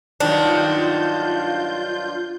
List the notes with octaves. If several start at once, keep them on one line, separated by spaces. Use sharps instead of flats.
G2 D#3 F#3 D4 F4 G6